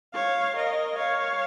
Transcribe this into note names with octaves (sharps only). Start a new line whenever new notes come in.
C#5 F5
A#4 D#5
C#5 F5